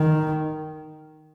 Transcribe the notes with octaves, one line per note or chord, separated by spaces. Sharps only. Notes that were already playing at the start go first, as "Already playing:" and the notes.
Already playing: D#3